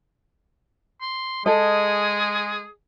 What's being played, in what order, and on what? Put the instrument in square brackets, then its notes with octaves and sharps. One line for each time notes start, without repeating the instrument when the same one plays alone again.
[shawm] C6
[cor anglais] G#3 [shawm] G#4 [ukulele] A4 D#5